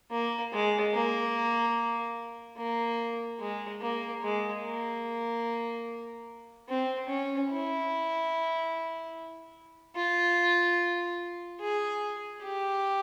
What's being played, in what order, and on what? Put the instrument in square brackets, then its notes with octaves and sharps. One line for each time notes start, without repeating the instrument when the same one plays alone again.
[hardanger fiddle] A#3
G#3
A#3
A#3
G#3
A#3
G#3
A#3
C4
C#4
E4
F4
G#4
G4